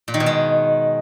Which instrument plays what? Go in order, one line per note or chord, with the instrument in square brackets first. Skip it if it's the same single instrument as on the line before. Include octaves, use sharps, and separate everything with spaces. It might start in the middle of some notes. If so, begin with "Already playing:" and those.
[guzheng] A#2
D#3
B2
G#3